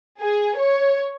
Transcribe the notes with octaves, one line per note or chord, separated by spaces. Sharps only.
G#4
C#5